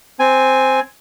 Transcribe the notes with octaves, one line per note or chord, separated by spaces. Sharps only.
C4 G#5